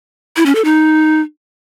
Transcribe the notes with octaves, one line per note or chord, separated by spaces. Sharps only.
E4
C#4
A4
D#4